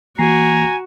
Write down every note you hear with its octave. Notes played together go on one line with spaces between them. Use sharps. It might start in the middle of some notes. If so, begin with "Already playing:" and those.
E3 A#3 F#4 G#5 A#5 C7